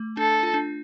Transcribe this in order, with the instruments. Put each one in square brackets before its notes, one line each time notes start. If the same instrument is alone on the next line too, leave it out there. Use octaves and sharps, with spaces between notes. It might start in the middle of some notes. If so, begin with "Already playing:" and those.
Already playing: [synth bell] A3
[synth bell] D4 [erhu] A4
[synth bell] F4
D4